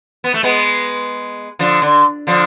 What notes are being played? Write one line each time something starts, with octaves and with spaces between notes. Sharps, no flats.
B3
A3
G#3 B3
D3 F3
D3
D3 F3